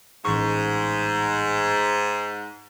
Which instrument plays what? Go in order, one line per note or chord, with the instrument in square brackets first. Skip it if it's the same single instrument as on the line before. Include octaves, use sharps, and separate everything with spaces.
[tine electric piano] A1 C#6 [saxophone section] G#2